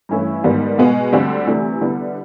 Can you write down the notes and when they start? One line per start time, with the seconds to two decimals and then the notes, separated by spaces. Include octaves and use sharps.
0.09 G2 E3 A3 C#4 E4
0.44 G#2 D#3 G3 B3
0.78 B2 G#3 B3
1.13 D2 D3 G3 C4
1.47 C3 E3 A3 D4
1.81 D3 G3 B3 E4